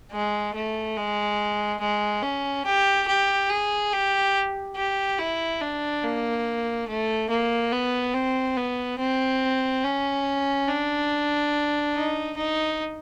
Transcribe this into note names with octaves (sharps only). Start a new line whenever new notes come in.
G#3
A3
G#3
G#3
C#4
G4
G4
G#4
G4
G4
E4
D4
A#3
A3
A#3
B3
C4
B3
C4
C#4
D4
D#4
D#4